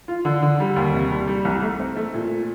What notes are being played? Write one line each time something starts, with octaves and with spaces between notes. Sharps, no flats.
F4
D3
D3
G3
D#2
C3
G3
G3
C2
A3
C4
A3
A#2